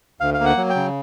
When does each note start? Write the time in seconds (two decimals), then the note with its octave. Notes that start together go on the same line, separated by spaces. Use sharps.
0.21 D2 F5
0.34 F5
0.39 A#3
0.45 F#5
0.57 F#3
0.70 G5
0.75 C#3